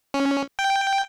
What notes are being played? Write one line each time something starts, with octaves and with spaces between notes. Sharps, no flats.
C#4
G5